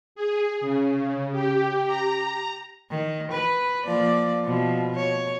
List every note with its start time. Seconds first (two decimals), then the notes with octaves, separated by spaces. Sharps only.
0.15 G#4
0.61 C#3
1.32 G4
1.87 A#5
2.90 D#3
3.32 B4
3.85 F3 A#3 D5
4.45 B2 F3
4.95 C#5